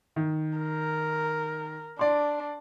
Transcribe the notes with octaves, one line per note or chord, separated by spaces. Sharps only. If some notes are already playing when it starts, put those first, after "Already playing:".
D#3
A#4
D4 D5 C6